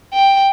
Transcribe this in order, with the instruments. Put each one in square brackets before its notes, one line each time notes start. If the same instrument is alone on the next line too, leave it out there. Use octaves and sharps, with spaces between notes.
[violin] G5